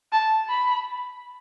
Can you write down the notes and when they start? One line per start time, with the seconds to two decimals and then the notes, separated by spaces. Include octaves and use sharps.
0.12 A5
0.49 B5